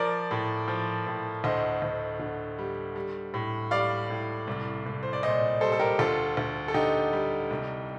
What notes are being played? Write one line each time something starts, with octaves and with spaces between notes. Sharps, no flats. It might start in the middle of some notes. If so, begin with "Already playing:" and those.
Already playing: F3 A#4 D5
A2
F3
A2
D2 C5 D#5
D2
D3
G3
G3
A2
G3 D5 F5
A2
C2
C2
C5
D5
A#2 C5 D#5
G3 A4 C5
A4
G4 A#4
D2 F4 A4
D2
A4
D3 D#4 G4
G3
C2